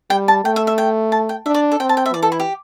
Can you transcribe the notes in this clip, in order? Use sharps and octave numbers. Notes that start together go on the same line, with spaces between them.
G3 G5
A5
A3 G5
E5
E5
G5
A5
G5
D4 E5
D5
A4
C4 G5
A5
G5
E5
E3 D5
A4
E4
G4